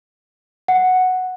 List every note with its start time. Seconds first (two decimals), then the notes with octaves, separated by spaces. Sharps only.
0.68 F#5